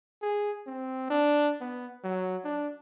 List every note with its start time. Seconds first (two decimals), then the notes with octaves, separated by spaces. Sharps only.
0.22 G#4
0.67 C4
1.10 D4
1.61 B3
2.04 F#3
2.44 D4